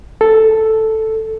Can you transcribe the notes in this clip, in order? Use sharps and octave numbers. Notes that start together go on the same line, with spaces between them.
A4